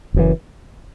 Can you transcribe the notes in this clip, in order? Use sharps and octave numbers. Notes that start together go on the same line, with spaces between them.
F#1 F#2 E3